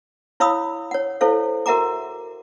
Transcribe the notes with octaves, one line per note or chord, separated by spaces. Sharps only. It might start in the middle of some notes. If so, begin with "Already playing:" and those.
E4 C#5 F5 B5 D#6 E6
C#5 F#5
E4 A4 C5 C#5 F5
F#4 A#4 E5 F#5 A#5 D6